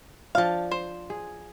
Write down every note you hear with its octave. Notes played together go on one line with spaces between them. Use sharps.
F3 D4 F5 A5
C5
G#4